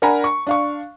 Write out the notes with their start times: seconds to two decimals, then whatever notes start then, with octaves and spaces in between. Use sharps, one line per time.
0.02 D4 A#4 F#5 G#5 A#5 B5
0.24 C#6
0.47 D4 F5 C#6